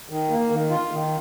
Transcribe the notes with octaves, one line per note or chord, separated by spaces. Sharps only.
D#3
A#3
D#3
F4
D#3